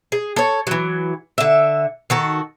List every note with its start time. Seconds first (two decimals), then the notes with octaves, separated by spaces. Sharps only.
0.12 G#4
0.36 A4 C#5
0.67 E3 F#3
1.38 D3 E5
2.10 D#3 F#4 A4